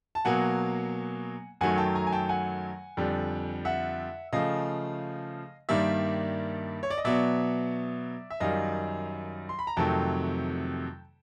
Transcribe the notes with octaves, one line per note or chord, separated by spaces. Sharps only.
A5
B2 F#3 A#3 F#5 G#5
F#2 D#3 F#3 A3 F#5 G#5
G5 A5
G#5 A#5
G#5
G5 A5
F#5 G#5
F2 D3 G3
E5 F#5
C#3 F3 A3 D#5 F5
G2 D#3 G3 A#3 D5 E5
C#5
D5
D#5
B2 F#3 B3 D5 E5
E5
F#2 D#3 G3 D#5 F5
C6
B5
A#5
F2 C3 D#3 F#3 A3 G5 A5